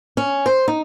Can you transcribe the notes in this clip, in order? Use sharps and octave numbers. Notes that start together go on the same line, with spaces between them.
C#4
C5
D#4